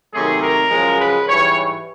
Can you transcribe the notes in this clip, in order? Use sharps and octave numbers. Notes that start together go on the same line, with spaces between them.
C3 D#3 F#3 A3 G#4
A#4
F#2 C#3 F3 G#3
B4
G#2 E3 G3 C#5